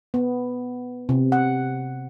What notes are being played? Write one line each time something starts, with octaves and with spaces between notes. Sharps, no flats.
B3
C3
F#5